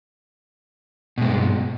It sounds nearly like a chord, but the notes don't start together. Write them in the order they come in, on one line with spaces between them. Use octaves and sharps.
B2 G#3 G2